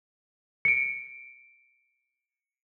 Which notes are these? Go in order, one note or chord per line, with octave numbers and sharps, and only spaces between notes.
C#7 D7